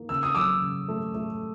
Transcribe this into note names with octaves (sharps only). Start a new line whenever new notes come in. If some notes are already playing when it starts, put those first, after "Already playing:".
Already playing: A#3 D#4
C#3 E6
D#6
F#3 D6 E6
C#3
A3
A3